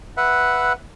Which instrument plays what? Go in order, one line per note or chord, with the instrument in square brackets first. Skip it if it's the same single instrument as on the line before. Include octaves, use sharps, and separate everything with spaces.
[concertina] B4 E5 F#5